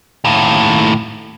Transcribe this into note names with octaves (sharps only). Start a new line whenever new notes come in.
D#2 A2